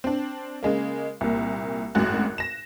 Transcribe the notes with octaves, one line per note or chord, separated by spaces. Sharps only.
C4 D4
C#3 G#3 A#3
C2 A#2
G#1 F#2 A2 F#4 F#6
A#6 E7